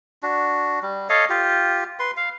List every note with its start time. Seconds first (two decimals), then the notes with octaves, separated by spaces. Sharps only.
0.23 D4 F#4
0.82 G3
1.09 A4 C#5 D#5 F5
1.29 F4 G4
1.99 B4 C6
2.17 F5